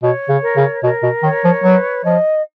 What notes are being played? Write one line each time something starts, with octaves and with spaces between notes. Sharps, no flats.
B2 C#5
C#3
A#4
C#3
B2 A#4
B2
D#3 C#5
F3
F#3 B4
F3 D#5